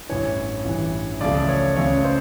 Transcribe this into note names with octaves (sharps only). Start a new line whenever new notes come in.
A1 G2 E3 C#5
A1 G2 E3
C#2 C#3 F3 A3 D5
C#5
C#2 C#3 F3 A3 C#5
C5